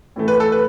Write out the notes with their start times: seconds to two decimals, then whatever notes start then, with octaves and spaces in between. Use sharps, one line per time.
0.16 A2 E3 A3
0.28 B4
0.40 A4
0.52 B4